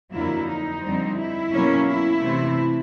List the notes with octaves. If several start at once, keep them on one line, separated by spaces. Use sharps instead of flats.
F2 D3 F#3 A#3 E4
D#4
F2 D3 G3 C4
E4
B2 F#3 A#3 C#4
E4
C3 E3 A3 C4